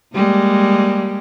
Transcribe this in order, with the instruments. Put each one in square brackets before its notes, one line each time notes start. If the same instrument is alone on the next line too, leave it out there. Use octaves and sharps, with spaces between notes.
[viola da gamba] G3 G#3 A#3